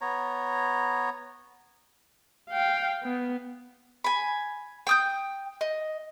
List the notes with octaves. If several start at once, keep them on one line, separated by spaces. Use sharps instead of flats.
B3 C#5 A#5
F5 G5
B3
G#5 B5
G5 D#6 G6
D#5